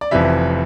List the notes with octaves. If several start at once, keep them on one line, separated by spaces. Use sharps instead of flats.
D5
F1 F2 C3 E3 E5